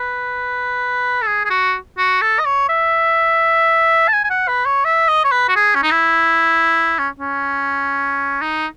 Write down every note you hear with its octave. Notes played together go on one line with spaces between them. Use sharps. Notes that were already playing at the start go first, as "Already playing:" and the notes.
Already playing: B4
A4
G#4
G#4
F#4
F#4
A4
D#5
C#5
E5
A5
G#5
G#5
F#5
B4
C#5
E5
D#5
C#5
B4
F#4
G#4
C#4
D#4
E4
C#4
C#4
D#4